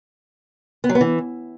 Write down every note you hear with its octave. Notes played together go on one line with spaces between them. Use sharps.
B3
F#3
B3
E3